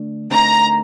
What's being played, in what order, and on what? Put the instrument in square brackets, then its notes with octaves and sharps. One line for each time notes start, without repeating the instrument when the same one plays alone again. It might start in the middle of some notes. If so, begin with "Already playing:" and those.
Already playing: [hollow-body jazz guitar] D3 A3 D4
[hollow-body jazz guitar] D3 A3 C4 D#4 A#4 [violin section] A#5